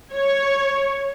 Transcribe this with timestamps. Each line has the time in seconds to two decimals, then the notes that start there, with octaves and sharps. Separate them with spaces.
0.12 C#5